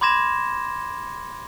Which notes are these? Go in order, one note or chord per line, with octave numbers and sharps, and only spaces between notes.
B5 C6 D6 G#6 A#6 E7